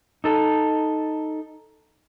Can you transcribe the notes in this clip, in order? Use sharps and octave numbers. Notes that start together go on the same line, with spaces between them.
D#4 A4